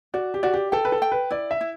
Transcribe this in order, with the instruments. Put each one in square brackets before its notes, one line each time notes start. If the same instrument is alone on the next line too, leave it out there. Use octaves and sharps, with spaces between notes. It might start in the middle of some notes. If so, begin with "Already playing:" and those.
[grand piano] F#4 [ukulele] D5
[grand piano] G4
[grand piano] F#4 [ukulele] D5
[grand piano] G4
[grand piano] A4 [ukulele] G5
[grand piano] B4
A4
[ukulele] G5
[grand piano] B4
[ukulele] E4 [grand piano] D5
[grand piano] E5
[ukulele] E4